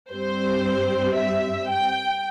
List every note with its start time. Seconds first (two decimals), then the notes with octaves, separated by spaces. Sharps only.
0.11 G2 G3 C4 C5
1.16 E5
1.69 G5